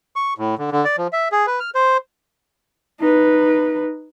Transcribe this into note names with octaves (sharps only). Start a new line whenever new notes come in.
C#6
A2
D3
D3
D5
F3
E5
G#4
B4
F6
C5
D#4 B4